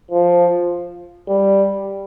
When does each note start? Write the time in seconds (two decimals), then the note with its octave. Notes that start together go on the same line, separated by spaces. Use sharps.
0.11 F3
1.28 G3